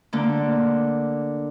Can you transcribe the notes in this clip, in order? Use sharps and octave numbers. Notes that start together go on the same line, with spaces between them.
D3 A#3